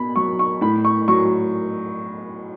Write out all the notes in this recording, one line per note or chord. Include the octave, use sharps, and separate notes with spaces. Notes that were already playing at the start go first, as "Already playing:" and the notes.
Already playing: B2 B5
F#3 C#6
C#6
A2 B5
C#6
F#3 C#6